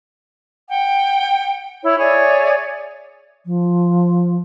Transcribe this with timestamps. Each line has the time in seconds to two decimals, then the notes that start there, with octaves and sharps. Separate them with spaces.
0.69 F#5 G5
1.83 E4 C#5
1.99 G#4 C#5 D5 E5
3.45 F3